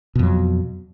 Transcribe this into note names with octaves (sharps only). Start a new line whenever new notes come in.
F2 B2 F#3